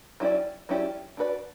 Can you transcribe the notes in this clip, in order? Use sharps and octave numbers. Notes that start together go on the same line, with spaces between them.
F#3 C#4 E4 G4 D5
F#3 C#4 E4 G4 D5
D4 F#4 B4 D5